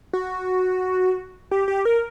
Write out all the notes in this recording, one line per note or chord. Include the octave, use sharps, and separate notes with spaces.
F#4
G4
G4
A#4